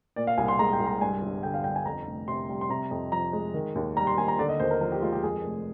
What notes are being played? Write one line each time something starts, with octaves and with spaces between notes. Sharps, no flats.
A#2 D5
F5
C2 G#5
C6
G#3 A#5
G5
C2
A#5
G2 G#5
G1
D3 G5
F5
G1 G5
G#5
F2 A#5
F1
C3 C6
G3
C6
C3 A#5
F2
F3 A#5
G#3
D#3
D#2
G3 A#5
C6
D#2 G#5
A#5
D3 D5
D#5
D#2 C5
A#4
F3 A#4
G4
G#3 F4
G4
F2 G#4
F1